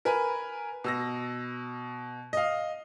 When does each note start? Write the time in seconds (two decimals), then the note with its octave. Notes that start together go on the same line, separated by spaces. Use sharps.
0.05 A#4 B4 G#5 B5
0.84 B2 E6 A#6
2.33 D#5 F5